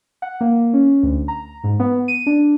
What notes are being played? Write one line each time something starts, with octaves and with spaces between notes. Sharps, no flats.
F#5
A#3
C#4
D2
A#5
G#2
B3
D#7
D4